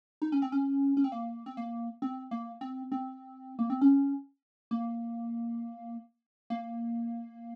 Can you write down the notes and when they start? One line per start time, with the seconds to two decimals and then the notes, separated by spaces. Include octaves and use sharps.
0.22 D#4
0.32 C#4
0.42 C4
0.52 C#4
0.97 C#4
1.04 C4
1.12 A#3
1.46 C4
1.57 A#3
2.02 C4
2.31 A#3
2.61 C4
2.92 C4
3.59 A#3
3.70 C4
3.81 C#4
4.71 A#3
6.50 A#3